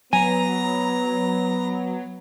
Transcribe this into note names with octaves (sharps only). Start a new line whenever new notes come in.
F#3 B3 G#5 A#5